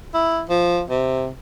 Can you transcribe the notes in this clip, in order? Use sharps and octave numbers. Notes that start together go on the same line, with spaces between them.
E4
F3
C3